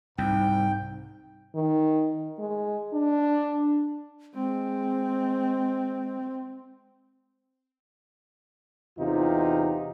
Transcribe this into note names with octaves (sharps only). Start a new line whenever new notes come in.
C2 G#2 G5
D#3
G#3
D4
G#3 C4
E2 C3 D#4 F4